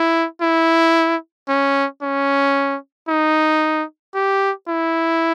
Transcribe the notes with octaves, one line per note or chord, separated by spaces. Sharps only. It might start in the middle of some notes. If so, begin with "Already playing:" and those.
Already playing: E4
E4
C#4
C#4
D#4
G4
E4